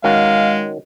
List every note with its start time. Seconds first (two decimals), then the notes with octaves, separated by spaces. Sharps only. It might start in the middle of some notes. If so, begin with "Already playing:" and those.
0.04 D#3 G#3 C#4 F#4 F5